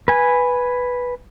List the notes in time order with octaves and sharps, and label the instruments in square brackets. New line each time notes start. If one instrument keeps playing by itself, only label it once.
[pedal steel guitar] B4 G#5